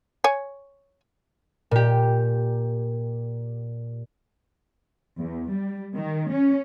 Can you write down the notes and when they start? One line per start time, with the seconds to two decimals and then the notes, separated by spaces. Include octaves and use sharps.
0.24 C#5 G#5
1.71 A#2 G4
5.19 E2
5.52 G3
5.95 D#3
6.30 C#4